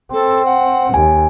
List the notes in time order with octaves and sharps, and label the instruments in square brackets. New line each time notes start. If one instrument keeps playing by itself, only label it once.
[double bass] C4 [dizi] A4
[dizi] F#5
[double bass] D#2 [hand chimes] G#5